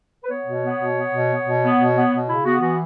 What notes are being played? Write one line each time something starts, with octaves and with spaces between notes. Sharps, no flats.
B4
B3 C#5
B2
B3
B2
B3
B2
B3
B2
B3
B2
B3
B2
C#3 E4
B3 F#4
E3 F#4